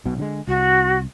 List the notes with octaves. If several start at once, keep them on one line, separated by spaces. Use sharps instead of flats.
B1 B2
D3 F3 G#3
C2 F#4